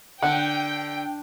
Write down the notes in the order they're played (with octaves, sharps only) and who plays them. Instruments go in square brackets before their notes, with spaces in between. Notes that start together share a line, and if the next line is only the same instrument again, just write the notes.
[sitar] D3 [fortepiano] F#5 [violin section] G5